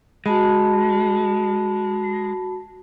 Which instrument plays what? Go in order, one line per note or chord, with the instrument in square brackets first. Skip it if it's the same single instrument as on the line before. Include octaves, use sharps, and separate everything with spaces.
[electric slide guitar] G#3 [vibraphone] F#4 A5 B5